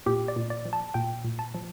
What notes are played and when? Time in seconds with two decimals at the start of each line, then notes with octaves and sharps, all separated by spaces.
0.06 A#2 G4
0.28 D5
0.36 A#2
0.50 D5
0.65 F3
0.73 A5
0.94 A#2 G5
1.25 A#2
1.39 A5
1.55 F3